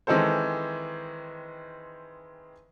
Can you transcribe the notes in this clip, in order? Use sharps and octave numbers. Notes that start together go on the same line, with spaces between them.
D#3 E3 G#3 C4 A4 C5